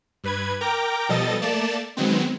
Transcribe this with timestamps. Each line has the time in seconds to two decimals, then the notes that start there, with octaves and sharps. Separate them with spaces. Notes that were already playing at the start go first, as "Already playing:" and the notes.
0.24 G2 B4 G#6
0.61 A#4 G5 A#5 D6
1.09 B2 F3 G3 A4 D#5 A6
1.42 A3 A#3 D5 A5 E7
1.97 D#3 F#3 G#3 B3 C4